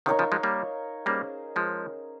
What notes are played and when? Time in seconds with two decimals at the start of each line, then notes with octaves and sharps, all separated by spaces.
0.06 C3 D#3 D#4 A#4 C#5 F5
0.19 C#3 F3
0.32 F3 G#3
0.43 G3 A#3
1.06 G3 A#3 C#4 G#4 C5
1.56 F3 G#3